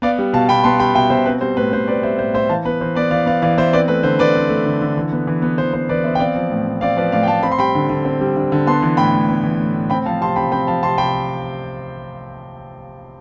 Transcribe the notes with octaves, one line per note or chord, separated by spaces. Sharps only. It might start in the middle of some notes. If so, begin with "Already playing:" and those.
B3 D5 F5
G3
B2 F5 A5
B2 G5 B5
B3 A5 C6
G3 G5 B5
B2 E5 G5
B2 C5 E5
C4 B4
G3 C5
A2 B4
A2 C5
C4 B4 D5
G3 C5 E5
A2 C5 E5
A2 C5 E5
E3 F5 A5
B3 B4
E3 C5
B3 B4 D5
E3 D5 F5
B3 D5 F5
E3 D5 F5
B3 C5 E5
C4 B4 D5
A3 B4
D3 C5
D3 B4 D5
C4
A3
D3
D3
E3
B3
E3
B3
E3 C5
B3 C5
E3 B4 D5
B3 C5 E5
G5
C4 D5 F5
F3
A2
A2
C4 D5 F5
F3 B4 D5
A2 D5 F5
G5
A2 F5 A5
C4 B5
C6
G3 G5 B5
D3
D3
C4
G3
D3
D3
B3 A5 C6
E3
A2 G5 B5
A2
B3
E3
A2
A2
C4 G5 B5
F3 F5 A5
C3 A5 C6
C3 G5 B5
C4 G5 B5
F3 F5 A5
C3 A5 C6
C3 G5 B5